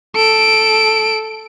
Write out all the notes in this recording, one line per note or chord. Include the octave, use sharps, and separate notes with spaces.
A4 D7